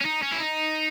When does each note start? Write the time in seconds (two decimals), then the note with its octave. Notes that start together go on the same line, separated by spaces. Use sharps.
0.01 C#4
0.05 D#4
0.22 C#4
0.32 E4
0.40 D#4